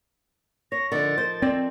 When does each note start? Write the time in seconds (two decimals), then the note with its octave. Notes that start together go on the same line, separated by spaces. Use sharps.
0.72 C#5 A#6
0.92 D3 F3 D#4 A#4 A6
1.18 C5
1.42 C4 D5